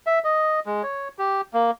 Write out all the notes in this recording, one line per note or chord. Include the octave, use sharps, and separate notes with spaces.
E5
D#5
G#3
C#5
G4
A#3